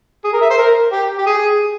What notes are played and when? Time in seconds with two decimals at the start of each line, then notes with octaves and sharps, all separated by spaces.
0.24 G#4
0.33 A#4
0.42 E5
0.50 C5
0.58 A#4
0.92 G4
1.18 G4
1.26 G#4